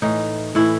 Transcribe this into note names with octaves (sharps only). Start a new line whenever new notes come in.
A2 E3 D#4
A2 E3 E4